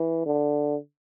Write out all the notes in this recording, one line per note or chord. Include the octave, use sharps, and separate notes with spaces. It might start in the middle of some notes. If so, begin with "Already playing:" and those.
Already playing: E3
D3